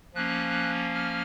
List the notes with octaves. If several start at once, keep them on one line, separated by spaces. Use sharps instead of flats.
F3 A#3 C#4 F#6
F6